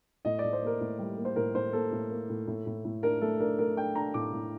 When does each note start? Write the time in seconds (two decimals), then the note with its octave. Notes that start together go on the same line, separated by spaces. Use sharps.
0.25 A2 D#5
0.39 A2 D5
0.53 C5
0.62 A#3 A#4
0.81 A2
0.99 G3
1.18 A#3
1.25 C5
1.36 A2 A#4
1.55 A2 C5
1.73 A#3 A4
1.92 A2
2.10 A#3
2.29 A2
2.47 A2
2.66 A2
2.84 A2
3.03 D4 A#4
3.21 A3 A4
3.40 D4 A#4
3.58 A3 A#4
3.77 D4 G5
3.95 D4 A#5
4.14 A2 D6
4.33 A2